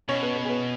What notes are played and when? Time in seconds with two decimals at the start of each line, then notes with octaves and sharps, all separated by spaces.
0.09 B2 C#4 C#5
0.23 B3 B4
0.36 B3 B4
0.45 G#4
0.50 B3 B4